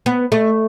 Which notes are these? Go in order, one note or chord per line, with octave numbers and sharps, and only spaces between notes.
B3
A3